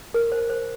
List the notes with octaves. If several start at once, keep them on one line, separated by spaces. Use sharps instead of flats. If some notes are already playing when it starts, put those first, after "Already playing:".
A#4
C5
C5